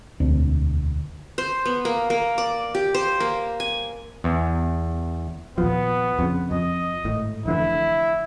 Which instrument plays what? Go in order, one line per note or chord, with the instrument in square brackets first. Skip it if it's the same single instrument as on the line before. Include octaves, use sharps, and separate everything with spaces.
[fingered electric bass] E1 D2 C4 D4
[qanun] C5
B3
A#3
A#3
D5
G4
C5
A#3
G#5
[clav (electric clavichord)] E2
[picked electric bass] A#1 D#2 F3 [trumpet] B3
[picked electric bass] F2 C#3
[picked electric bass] F2 [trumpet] D#5
[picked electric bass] G#1 A2
[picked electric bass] F1 D3 E3 [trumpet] E4